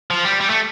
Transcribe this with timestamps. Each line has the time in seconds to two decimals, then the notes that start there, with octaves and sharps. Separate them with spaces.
0.11 F3
0.25 G3
0.41 G3
0.50 A3